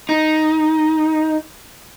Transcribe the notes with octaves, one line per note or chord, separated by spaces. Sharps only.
D#4